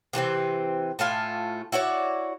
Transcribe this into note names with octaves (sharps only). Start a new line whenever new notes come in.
C3 E3 A3 C4
A2 A3 F4 G#5
E4 F#4 C#5 D5